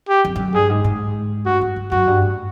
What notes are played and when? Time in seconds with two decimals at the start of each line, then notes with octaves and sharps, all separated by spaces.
0.09 G4
0.25 F2
0.36 G2
0.39 F#2
0.54 G2 G#4
0.70 G#2
0.84 G#2
1.46 G2 F#4
1.61 G2
1.76 G2
1.92 F#2 F#4
2.07 G2
2.22 A2